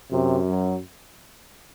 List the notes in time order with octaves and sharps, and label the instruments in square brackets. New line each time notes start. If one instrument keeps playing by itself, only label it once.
[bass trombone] F#2 [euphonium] C3
[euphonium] F#3